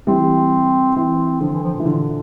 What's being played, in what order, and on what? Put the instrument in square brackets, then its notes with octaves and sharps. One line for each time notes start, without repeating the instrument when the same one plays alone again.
[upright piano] E3 G3 [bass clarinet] C4
[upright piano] E3 [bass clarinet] C4
[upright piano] D3 [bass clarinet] F3
[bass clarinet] E3
F3
A#2
[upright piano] E3
D3